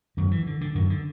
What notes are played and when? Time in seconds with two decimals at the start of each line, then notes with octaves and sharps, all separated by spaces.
0.17 F#2 D#3
0.31 E3
0.47 D3
0.61 D3
0.75 F#2 D#3
0.90 D3